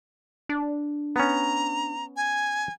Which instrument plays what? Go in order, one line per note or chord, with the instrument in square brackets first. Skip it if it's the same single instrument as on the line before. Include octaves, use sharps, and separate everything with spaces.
[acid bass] D4
[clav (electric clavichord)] B3 C#4 [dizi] A#5
[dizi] G#5